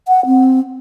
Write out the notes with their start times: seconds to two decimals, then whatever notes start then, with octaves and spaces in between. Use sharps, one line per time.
0.08 F#5
0.26 C4